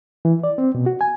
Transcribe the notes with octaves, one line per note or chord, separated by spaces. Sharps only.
E3
D5
C4
B2
F#4
G#5